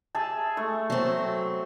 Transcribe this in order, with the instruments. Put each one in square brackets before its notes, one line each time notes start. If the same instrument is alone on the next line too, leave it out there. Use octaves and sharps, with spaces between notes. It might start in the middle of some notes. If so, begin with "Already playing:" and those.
[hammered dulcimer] G#4 E5 A5
A3 C#6
[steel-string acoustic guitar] F#3 C4